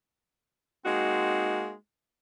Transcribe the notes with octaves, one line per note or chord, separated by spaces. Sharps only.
G#3 A#3 C4 D#4 F#4